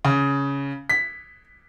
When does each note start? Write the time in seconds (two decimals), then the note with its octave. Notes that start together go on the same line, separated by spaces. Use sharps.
0.05 C#3
0.89 B6